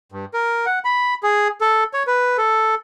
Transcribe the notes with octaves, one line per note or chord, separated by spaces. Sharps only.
G2
A#4
F#5
B5
G#4
A4
C#5
B4
A4